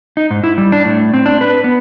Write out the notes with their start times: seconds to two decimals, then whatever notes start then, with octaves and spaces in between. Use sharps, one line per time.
0.17 D#4
0.31 G#2
0.44 E4
0.58 G3
0.72 D4
0.85 A2
1.14 C4
1.26 D4
1.41 B4
1.64 B3